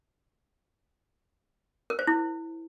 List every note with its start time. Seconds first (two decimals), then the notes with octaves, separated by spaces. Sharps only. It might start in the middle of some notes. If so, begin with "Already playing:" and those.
1.90 A#4
1.99 C5
2.07 E4